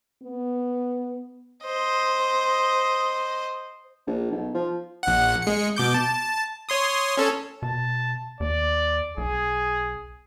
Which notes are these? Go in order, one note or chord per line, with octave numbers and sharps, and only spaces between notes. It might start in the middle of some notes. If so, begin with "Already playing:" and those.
B3
C5 D#5
A#1
B1
F3
A#1 F#5
G#3 C#7
B2 D6 G6
A5
C#5 C6 D#6
C#4 A4
B2 A5
D#2 D5
B1 G#4